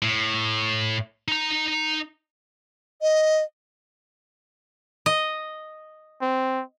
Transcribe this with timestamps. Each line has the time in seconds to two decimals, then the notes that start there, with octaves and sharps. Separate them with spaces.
0.02 A2
1.28 D#4 A#5
3.02 D#5
5.06 D#5
6.22 C4